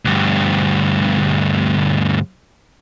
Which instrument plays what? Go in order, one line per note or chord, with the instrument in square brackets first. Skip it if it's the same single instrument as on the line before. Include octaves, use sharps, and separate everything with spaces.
[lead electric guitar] D2 G2